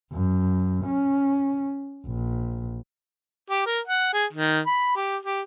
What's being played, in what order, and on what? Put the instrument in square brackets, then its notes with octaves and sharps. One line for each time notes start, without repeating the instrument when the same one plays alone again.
[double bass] F#2
C#4
A#1
[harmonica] G4
A#4
F#5
G#4
D#3
B5
G4
G4